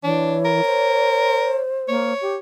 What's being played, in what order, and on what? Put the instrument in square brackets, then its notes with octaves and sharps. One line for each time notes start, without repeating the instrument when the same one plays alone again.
[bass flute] E3 [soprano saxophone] D4 [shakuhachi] C#5
[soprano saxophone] A#4
[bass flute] C5
[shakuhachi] A#3 [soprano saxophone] C#5
[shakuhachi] G4